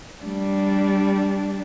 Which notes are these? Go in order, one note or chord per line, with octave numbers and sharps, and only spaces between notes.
G3 D4